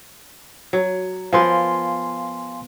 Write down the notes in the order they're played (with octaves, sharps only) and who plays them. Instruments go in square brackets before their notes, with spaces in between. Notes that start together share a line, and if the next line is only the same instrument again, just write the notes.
[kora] F#3
[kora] F3 B3 A#4 [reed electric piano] F5 G#5 C6